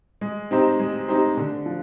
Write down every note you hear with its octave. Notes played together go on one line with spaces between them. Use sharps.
G#3
C4 D#4 G4 C5
G#3
C4 D#4 G4 C5
D3
F3